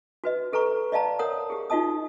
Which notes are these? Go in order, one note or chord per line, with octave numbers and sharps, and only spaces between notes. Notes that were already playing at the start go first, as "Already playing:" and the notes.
F#4 B4 D#5
G4 A4 B4 A#5 C#6
D5 D#5 F5 A5 A#5
A#4 C#5 F#5 D#6
G4 G#4
D#4 F4 F#4 D#5 A5 D#6